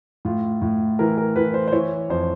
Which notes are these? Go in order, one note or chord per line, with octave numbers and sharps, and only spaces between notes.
A2 F4
A2
E3 A#4
A#4
E3 B4
C5
C5
E3 C#5
F2 C5